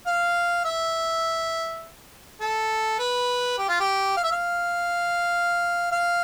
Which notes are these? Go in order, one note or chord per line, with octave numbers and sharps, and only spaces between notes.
F5
E5
A4
B4
G4
F4
G4
F5
E5
F5
F5